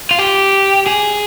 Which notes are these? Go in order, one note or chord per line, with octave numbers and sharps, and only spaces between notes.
F4
G4
G#4